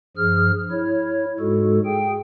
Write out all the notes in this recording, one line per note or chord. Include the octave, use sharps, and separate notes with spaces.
G2 F3 G#4 F6
E4 C#5
G#2 G#3 F#4 A4
G#4 G5